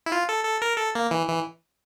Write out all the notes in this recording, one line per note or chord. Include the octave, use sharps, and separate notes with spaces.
E4
F4
A4
A4
A#4
A4
A#3
E3
E3